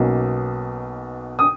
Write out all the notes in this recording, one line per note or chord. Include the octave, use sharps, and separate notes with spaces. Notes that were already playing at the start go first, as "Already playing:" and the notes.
Already playing: B1 B2 A#3 C#4
D#6